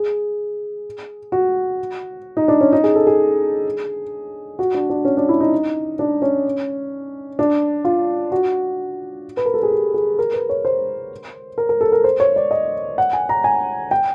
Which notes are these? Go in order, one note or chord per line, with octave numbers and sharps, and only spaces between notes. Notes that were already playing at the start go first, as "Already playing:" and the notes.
Already playing: G#4
F#4
D#4
D4
C#4
D#4
G#4
A4
G#4
F#4
D4
D4
C#4
D4
E4
D#4
D4
C#4
D4
F4
F#4
B4
A#4
A4
G#4
G4
G#4
A#4
B4
C#5
C5
A#4
A#4
A4
A#4
C5
C#5
D5
D#5
F#5
G#5
A#5
G#5
G5